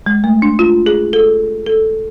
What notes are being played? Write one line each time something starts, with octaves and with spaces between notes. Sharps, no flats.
G#3
A3
D4
F4
G#4
A4
A4